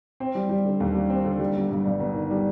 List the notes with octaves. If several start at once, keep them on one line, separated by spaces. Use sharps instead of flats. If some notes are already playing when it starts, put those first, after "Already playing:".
C4
G3
G3
D3
D#2
G3
C4
D3
G3
G1
G2
G2
G1
D#3
G3